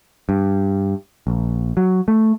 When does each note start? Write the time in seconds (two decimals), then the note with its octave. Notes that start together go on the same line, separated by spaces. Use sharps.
0.29 G2
1.27 A#1
1.77 F#3
2.08 A3